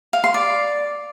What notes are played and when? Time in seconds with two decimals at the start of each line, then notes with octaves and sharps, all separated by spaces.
0.13 F5
0.24 C6
0.34 D5